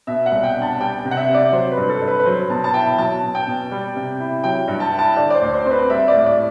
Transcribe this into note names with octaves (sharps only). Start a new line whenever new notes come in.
B2 E5
F#5
C2
G5
D4
A5
G3 G5
G5
C3
F#5
E5
C3
D5
F#3 C5
B4
G2
A4
G2
B4
B4
F#3 C5
B2 A5
A5
E4 G5
F#3 A5
B2
G5
B2
G3
C3
E4
F#3 G5
G2
A5
E4
A5
D3 D5
D5
C5
D2
C5
C4 C5
B4
G3 E5
D5
A2
D5